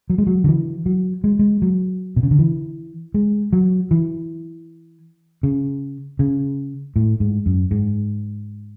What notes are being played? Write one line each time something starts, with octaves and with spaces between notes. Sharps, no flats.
F#3
G#3
F#3
D3
E3
F#3
G#3
G#3
F#3
B2
C#3
D3
E3
G#3
F#3
E3
C#3
C#3
A2
G#2
F#2
G#2